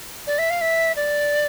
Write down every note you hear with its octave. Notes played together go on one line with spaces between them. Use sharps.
D5
E5
F5
E5
D5